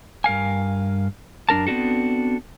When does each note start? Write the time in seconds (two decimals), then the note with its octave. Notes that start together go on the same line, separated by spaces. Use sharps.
0.24 G2 A#4 F5 G#5
1.49 F#2 D4 A#4 A5
1.67 B3 C4 D4 F#4 A4